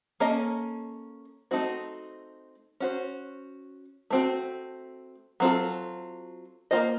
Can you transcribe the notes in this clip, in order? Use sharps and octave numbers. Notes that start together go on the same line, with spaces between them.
A#3 C#4 A4 D#5
A3 C4 D#4 F#4 C5
C#4 F#4 C5
A3 C4 F#4
F#3 C4 F4 A4
A#3 C#4 F4 C5 D#5